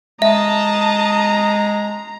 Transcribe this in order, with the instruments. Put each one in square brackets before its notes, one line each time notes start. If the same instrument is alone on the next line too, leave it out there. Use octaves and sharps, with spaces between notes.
[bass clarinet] G#3 [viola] D#5 A5 [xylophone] E5 [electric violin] A#5